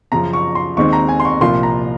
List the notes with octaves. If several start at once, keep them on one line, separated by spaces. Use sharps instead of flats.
F#2 C#3 F3 A#5
C#6
C6
D#2 D#3 G#3 C4 C#6
A#5
G#5
C6
C#6
C2 A#2 F3 A#3 F4 C6
A#5